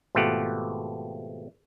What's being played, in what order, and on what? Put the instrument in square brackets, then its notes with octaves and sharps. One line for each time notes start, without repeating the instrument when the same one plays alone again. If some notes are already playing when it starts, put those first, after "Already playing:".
[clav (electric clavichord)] G#1 B2 A3 F4 G4 F#5